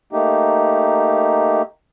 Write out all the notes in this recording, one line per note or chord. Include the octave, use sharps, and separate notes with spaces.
A3 A#3 D#4 G4